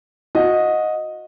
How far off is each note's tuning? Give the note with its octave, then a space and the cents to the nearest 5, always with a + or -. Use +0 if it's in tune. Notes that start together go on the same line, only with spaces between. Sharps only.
F#4 -25 D#5 +0